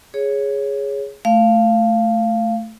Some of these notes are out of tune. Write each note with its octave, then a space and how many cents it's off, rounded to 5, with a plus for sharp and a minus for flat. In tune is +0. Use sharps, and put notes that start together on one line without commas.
G#4 +0 C#5 +0
A3 +0 F5 -15